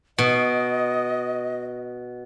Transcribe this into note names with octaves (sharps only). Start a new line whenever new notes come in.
B2 D#5